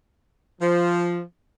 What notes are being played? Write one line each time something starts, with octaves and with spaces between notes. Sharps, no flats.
F3